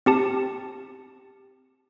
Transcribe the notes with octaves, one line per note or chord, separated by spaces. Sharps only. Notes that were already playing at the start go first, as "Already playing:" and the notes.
C4 G4 A5